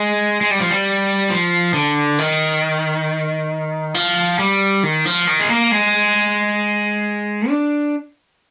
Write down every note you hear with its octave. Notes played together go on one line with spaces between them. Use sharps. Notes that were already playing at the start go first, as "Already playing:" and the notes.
Already playing: G#3
G#3
G3
F3
G3
F3
D3
D#3
F3
G3
D#3
F3
D#3
G#3
A#3
G#3
D4